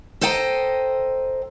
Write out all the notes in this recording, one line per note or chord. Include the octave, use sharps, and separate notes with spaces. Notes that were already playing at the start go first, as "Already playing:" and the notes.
A4 C5 D#5 G5 G#5 A#5